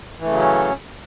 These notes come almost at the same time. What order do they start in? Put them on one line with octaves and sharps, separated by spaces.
E3 A3 C#3 F#3 C#4